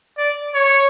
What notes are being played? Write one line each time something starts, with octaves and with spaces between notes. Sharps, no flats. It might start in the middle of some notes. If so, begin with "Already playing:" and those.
D5
C#5